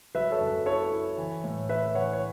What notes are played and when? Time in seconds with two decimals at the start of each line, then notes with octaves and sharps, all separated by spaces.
0.15 F#3 B4 E5
0.31 A4 C#5
0.41 F#2
0.66 E4 A4 C#5
0.92 E4
1.18 E3
1.44 A2
1.69 E3 B4 E5
1.94 E3 C#5 F#5
2.13 C#5